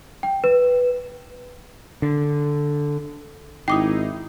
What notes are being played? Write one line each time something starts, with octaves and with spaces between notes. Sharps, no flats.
G5
B4
D3
G#1 D#4 E4 G5 D6 D#6